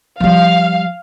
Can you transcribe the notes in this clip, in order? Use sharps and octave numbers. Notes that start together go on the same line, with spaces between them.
F3 G3 F5